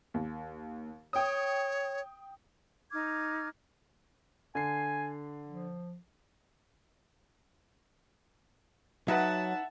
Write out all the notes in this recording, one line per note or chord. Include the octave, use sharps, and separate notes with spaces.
D#2
C#5 G5 D#6
D#4 D6 F6 G#6
D3 G#5 C7
F3
F#3 D#4 B4 E5 F#5 A5